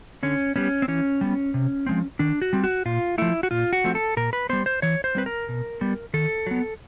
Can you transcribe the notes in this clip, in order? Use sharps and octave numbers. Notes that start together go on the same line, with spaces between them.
D3 C#4
G3 B3 C#4
C4
E3 C#4
G3 B3
C3
F3 G#3 C4
D#3 D4
F#4
G3 C4
F#4
A#2 F4
F3 A3 E4
F#4
A#2 F4
F#4
F3 A3 C4
A4
A#2 A#4
B4
G3 B3 C5
C5
E3 C#5
C5
G3 C4 B4
A#4
B2
G3 B3
D#3 A4
F#3 B3